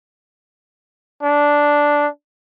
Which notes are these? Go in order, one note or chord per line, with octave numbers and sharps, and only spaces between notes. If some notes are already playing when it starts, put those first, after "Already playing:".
D4